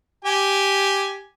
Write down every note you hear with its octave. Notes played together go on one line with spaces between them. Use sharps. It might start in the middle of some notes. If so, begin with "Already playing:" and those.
G4 G#5